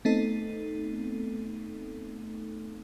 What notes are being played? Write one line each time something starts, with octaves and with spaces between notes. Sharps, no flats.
A3 B3 C4 D#4 A4